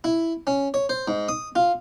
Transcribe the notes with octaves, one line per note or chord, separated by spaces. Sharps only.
E4
C#4
C#5
C5
G#2
D#6
F4